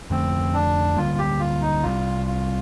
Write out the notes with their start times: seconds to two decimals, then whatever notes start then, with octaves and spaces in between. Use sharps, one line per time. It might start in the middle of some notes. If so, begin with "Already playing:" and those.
0.10 F2 D3 F3 A3 C4
0.54 D4
0.96 D2 D3 G3 A#3 F4
1.19 G4
1.40 F4
1.61 D#4
1.83 C2 C3 D#3 G3 F4
2.27 F4